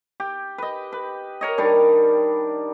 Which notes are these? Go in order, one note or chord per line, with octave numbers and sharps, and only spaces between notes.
G4
B4 D#5
B4
A#4 C#5 D#5
D#3 G3 D4